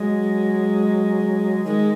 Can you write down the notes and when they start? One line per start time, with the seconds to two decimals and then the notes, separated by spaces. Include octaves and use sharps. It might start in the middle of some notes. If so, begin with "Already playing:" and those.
Already playing: F#3 G#3
1.65 D#3 G#3